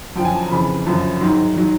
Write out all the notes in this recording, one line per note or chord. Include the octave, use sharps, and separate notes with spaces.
F#2 D3 F3 G5
G#5
A5
A#5
F2 C#3 E3 B5
F#2 D3 F3
G#2 D#3 F#3 C6
D#3 F#3